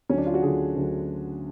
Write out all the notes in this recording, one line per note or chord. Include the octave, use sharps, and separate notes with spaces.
D2 D3 F#3 C#4
D4
F4
F#4
D2 D3 F#3 G#4
D2 D3 F#3